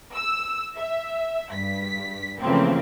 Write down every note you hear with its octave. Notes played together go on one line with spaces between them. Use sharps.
E6
E5
G2 B6
C#3 E3 F3 A3 A#3 C4